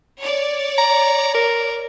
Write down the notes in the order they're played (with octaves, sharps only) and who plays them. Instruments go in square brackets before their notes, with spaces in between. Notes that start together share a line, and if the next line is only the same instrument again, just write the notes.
[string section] C#5 D5
[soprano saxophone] A#5
A#4